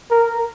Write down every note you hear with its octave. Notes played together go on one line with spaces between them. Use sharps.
A#4